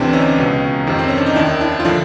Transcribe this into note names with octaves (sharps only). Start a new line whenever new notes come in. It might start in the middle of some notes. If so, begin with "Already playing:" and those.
Already playing: D2 C3 E3 C4 D4
C#4 D#4
C#2 B2
F2 C3 D#3
C4
C#4
D4
D#4
D#2 D#3 D4 E4
D4 E4
F4
D3 F3 D4 E4